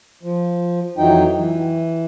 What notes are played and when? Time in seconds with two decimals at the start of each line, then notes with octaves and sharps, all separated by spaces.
0.23 F3
0.98 F2 E3 F#3 D#4 G5
1.36 E3